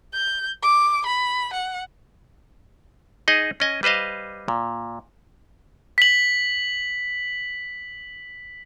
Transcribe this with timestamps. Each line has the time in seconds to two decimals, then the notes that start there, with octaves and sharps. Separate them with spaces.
0.13 G6
0.63 D6
1.05 B5
1.53 F#5
3.28 D#4 G#4 D#5
3.60 C#4 D#5 G#5
3.83 G3 B4 C5 D#5 F5
4.48 A#2
5.98 B6 F#7